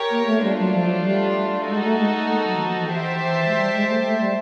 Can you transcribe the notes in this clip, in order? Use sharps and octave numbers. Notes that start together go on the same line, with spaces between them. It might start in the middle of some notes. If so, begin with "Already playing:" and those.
Already playing: G4 A#4 C#5
A#3
A3
G3 A3 D4 F4
F#3
F3
F#3
G3
G#3 D#4 F#4 A4
A3
G#3
A3
A#3
F#3
E3
F3
E3
E3 G4 C5 E5 A5
E3
E3
G#3
G3
G#3
A3
A3
G3